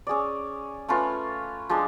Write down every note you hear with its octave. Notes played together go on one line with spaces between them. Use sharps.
C#4 G#4 D5
A3 C#4 F4 B4
F3 G#3 D4